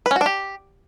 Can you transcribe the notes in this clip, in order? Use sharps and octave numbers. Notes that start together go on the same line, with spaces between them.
B4
C#4
F#4
D4
G4